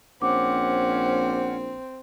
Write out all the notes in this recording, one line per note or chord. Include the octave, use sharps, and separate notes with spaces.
A#1 C4 C#4 F#5 D6